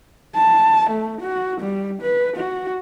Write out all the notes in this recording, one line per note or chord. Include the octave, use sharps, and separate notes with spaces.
A5
A3
F#4
G3
B4
F#4